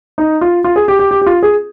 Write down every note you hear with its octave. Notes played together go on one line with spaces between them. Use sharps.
D#4
F4
F4
G#4
G4
G4
G4
G4
F4
G#4